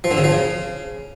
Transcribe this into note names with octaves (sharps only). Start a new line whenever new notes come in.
F3
D3
C#3
F3
C#3